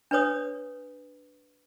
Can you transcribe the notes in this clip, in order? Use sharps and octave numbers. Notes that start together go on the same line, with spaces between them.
D4 B4 C#5 D#6